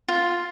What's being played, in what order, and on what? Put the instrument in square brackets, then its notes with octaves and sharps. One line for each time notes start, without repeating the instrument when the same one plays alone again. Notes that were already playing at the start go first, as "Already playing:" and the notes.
[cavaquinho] F4